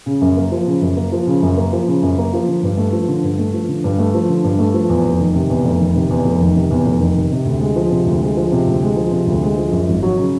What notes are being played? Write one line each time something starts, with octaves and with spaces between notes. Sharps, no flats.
C#3
F#2
A#3
F3
C#3
F#2
A#3
F3
C#3
F#2
A#3
F3
C#3
F#2
A#3
F3
D3
G2
A3
F3
D3
G2
A3
F3
D3
G2
A3
F3
D3
G2
A3
F3
E2
F1
D#3
C3
E2
F1
D#3
C3
E2
F1
D#3
C3
E2
F1
D#3
C3
C3
D2
G#3
F3
C3
D2
G#3
F3
C3
D2
G#3
F3
C3
D2
G#3
F3
F#2
G#1
F#3
C#3